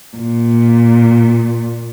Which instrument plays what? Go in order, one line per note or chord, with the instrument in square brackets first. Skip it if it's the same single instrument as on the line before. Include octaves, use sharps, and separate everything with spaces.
[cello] A#2